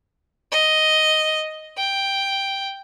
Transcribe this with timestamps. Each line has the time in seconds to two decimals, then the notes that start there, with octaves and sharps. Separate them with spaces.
0.51 D#5
1.77 G5